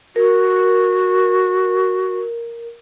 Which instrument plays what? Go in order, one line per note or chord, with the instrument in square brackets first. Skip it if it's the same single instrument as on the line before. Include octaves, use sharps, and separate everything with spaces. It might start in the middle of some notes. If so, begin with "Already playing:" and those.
[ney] F#4 [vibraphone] A#4